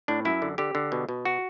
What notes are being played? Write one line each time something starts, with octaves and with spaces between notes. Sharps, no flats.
A2 D4
F#2 E4
D3
D3 G4
D3
B2
B2
F#4